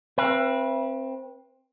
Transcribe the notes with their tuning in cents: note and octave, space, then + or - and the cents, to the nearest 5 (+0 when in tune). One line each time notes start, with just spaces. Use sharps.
C4 +10 B4 -25 E5 +35